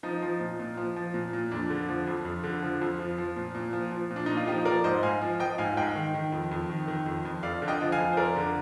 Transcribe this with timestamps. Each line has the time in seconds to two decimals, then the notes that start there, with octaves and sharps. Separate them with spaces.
0.03 F3 D#4
0.22 F3
0.40 A#2
0.60 A#2
0.77 F3
0.96 F3
1.14 A#2
1.33 A#2
1.51 F2 D4
1.70 D3
1.89 F3
2.07 F2
2.25 F2
2.44 D3
2.62 F3
2.81 F2
2.99 F3
3.18 F3
3.36 A#2
3.55 A#2
3.73 F3
3.92 F3
4.10 A#2
4.16 D4
4.26 A#2 D#4
4.37 F4
4.47 F3 D#4 G4
4.65 F3 A#4 D5
4.84 G#2 C5 D#5
5.02 G#2 F5 G#5
5.22 F3
5.40 F3 D#5 G5
5.58 G#2 F5 G#5
5.77 G#2 D#5 G5
5.95 D#3
6.14 D#3
6.32 F2
6.51 F2
6.69 D#3
6.88 D#3
7.06 F2
7.25 F2
7.43 F2 D5 F5
7.62 D3
7.68 D#5 G5
7.81 F3
7.92 F5 G#5
7.99 F2
8.13 C5
8.17 F2 A#4 D5
8.36 D3